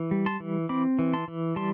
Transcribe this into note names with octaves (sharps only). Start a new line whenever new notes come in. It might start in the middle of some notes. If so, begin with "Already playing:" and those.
Already playing: E3
G3
A5 C6
E3
C4 B5 D6
E3
A5 C6
E3
G3 A5 C6